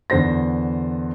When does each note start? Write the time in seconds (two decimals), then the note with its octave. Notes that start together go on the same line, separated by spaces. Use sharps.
0.10 E2 D3 C5 A#6